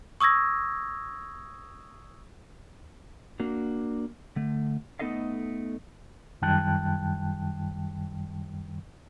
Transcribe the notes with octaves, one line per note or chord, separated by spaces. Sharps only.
C#6 D#6 E6 G#6 A#6
A#3 D4 F#4
D3 A3
A3 B3 D#4 A4 D#5 F5
F#2 D#3 G3 G5 A5 F#6